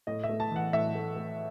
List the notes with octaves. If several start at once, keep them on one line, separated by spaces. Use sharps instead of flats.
A2 D#5
E5
A3
A5
E3 F#5
A2 E5
A3
A3